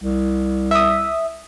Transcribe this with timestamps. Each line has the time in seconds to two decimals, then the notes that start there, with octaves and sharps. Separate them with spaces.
0.03 C2
0.71 E5 D#6